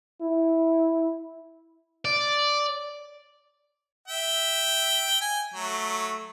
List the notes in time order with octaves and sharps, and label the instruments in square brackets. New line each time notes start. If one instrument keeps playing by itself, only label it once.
[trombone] E4
[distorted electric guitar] D5
[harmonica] E5 G5
G#5
F#3 A3